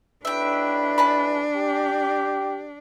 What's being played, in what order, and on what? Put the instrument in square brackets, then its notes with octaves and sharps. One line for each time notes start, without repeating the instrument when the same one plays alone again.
[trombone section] B1 E4 B4 [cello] D4 [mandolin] E5 G5
[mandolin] G#5 A5 B5
[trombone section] G4